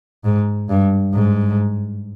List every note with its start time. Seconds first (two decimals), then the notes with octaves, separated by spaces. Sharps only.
0.25 G#2
0.69 G2
1.14 G#2